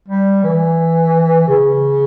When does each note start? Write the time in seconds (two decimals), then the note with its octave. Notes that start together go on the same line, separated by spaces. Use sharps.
0.08 G3
0.44 E3
1.48 C#3